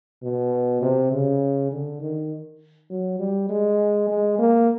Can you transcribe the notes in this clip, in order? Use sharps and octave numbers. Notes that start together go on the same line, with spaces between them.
B2
C3
C#3
D3
D#3
F#3
G3
G#3
G#3
A#3